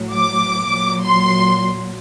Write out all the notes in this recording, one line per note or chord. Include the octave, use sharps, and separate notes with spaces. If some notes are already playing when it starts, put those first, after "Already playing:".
Already playing: A2 F#3
D6
A#2 F#3
C6